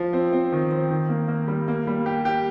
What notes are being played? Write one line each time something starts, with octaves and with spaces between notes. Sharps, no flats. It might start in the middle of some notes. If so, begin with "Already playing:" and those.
Already playing: F3
C4
C4
D#3
C4
D#3
A#3
A#3
G3
A#3
G3
G4
G4